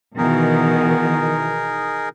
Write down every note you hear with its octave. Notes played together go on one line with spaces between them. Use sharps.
B2 D#3 E3 B3 D#4 G#4 A#4